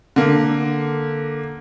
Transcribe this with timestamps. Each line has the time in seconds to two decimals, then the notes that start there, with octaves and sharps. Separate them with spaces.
0.16 D3 A#3